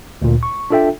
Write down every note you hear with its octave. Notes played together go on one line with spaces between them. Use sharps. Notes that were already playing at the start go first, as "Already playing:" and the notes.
D2 A#2
C#6
D4 F4 A4 E5 G5